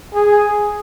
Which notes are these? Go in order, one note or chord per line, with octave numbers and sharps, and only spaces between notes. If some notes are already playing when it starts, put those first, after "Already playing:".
G#4